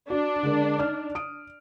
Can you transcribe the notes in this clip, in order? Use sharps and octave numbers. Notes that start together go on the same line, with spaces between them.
D4 F#4
D3 G#3 A#4
D#4 F6
D#6 D7